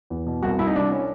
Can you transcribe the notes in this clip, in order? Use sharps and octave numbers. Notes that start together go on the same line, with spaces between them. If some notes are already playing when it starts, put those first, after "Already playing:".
E2
B2
C2 F#4
C2 E4
D#4
C2 D4
C#4